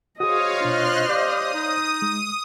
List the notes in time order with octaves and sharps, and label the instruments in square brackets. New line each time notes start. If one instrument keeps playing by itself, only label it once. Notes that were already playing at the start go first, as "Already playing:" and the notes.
[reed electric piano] F#4 G#4 [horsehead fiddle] C5 D#5 [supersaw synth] C#5 F5 [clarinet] D#6
[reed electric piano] B2 D4 [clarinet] F4 [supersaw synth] C6 F6 F#6
[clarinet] G4 [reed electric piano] C#5 D5 F5 [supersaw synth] D#6
[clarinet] D#4
[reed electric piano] G#3